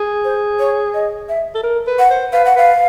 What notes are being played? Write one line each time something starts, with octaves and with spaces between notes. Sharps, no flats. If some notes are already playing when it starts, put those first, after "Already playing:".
Already playing: G#4
C5
C#5
D#5
E5
A4
A#4
B4
F#5
C5
B4 F5
F#5
B4 F5